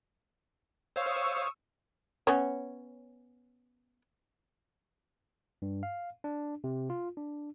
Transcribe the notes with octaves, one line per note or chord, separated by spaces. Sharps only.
C5 C#5 F5 C#6 D#6 E6
B3 C#4 C#5
G2
F5
D4
C3
F4
D4